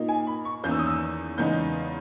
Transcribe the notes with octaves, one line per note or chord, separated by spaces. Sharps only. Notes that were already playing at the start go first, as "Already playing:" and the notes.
Already playing: A#2 A#3 D#4
G#5
B5
C#6
E2 D#3 A#3 C#4 G6
E6
D#6
E6
E2 C#3 G#3 B3 D#4 G6